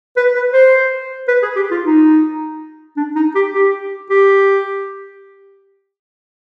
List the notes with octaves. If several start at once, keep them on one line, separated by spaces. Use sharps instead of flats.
B4
B4
C5
B4
G#4
G4
F4
D#4
D4
D#4
G4
G4
G4